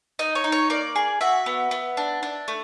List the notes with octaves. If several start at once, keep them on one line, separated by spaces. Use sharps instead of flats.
D#4 D#5
C#5
D#4
C#5
A#3 D5
G#4
F#4 E5
B3
B3
D4
D4
A3